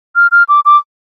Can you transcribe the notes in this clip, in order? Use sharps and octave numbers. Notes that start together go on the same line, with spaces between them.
F6
F6
D6
D6